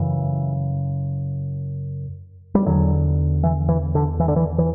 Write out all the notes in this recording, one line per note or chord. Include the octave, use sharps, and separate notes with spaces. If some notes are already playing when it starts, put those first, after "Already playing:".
Already playing: F#2 C#3 E3
G3
E2 D3 F#3
E3
E3
D3
E3
D3
E3
E3